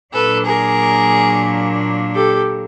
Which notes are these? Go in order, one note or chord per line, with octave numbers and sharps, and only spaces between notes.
A#2 F#3 A#3 D4 A4 B4
G#4 A#4
G4 A4